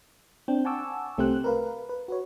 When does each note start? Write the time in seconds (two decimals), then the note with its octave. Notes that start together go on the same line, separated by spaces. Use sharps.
0.48 C4 D4 G5
0.65 F#5 G#5 A5 C#6 D6 E6
1.18 C2 A3 C4 G4 C5 F#6
1.44 A#4 B4 F5
1.89 B4
2.08 F#4 B4 C#5